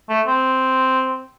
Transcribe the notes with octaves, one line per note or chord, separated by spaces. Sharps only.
A3
C4